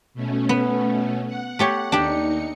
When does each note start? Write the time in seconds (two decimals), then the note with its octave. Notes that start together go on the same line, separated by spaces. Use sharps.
0.14 B2 A3 C#4
0.49 B3
1.27 F#5
1.59 A3 G4 C#5
1.92 D#2 D4 D#4 G4 C#7